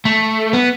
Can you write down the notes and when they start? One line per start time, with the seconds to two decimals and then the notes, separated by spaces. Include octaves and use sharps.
0.05 A3
0.53 B3